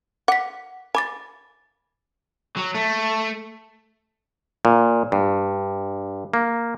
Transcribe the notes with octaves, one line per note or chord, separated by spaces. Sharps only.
F#5 D6 B6
G#5 B5 D6 A6
F#3
A3
A#2
G2
A#3